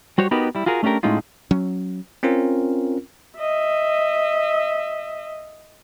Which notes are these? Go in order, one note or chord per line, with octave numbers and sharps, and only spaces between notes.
G3 F#4 C5 C#5
B3 D#4 F#4 G4 A#4 B4
G3 E4
F4 F#4 G#4 A#4
A3 C#4 D4 G4 A#4
A2 G#3 C#4 D#4 F4
F#3 C#4
C4 C#4 F4 A#4
D#5 E5